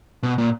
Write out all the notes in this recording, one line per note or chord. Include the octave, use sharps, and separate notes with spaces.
B2
A#2